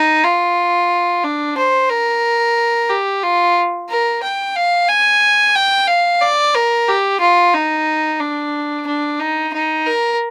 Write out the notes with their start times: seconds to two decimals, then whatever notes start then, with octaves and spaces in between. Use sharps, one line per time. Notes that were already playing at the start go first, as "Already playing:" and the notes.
Already playing: D#4
0.24 F4
1.24 D4
1.57 C5
1.90 A#4
2.89 G4
3.23 F4
3.89 A#4
4.23 G5
4.55 F5
4.89 G#5
5.55 G5
5.87 F5
6.21 D5
6.55 A#4
6.88 G4
7.20 F4
7.54 D#4
8.19 D4
8.87 D4
9.20 D#4
9.53 D#4
9.86 A#4